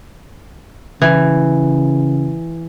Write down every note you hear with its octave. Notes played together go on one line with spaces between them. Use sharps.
C#3 E3